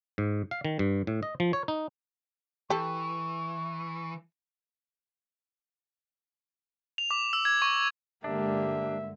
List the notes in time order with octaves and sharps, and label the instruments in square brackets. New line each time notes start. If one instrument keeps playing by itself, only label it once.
[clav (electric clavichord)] G#2
F5
D#3
G2
A2
D#5
F3
C#5
D#4
[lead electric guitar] E3 [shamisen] G4 A4 [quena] C#6
[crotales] F7
D6
E6
G#6
C#6
[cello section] G2 D3 G#3 [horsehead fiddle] A#3 G4 [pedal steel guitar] D4 [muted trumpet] E5